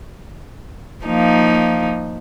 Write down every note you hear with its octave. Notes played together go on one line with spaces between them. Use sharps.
F3 A#3 D#4